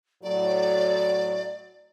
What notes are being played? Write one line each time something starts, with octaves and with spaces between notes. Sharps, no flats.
A2 F#3 D5